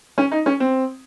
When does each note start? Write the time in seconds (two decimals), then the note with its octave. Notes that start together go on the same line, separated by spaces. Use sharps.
0.18 C#4
0.31 D#4
0.46 C#4
0.60 C4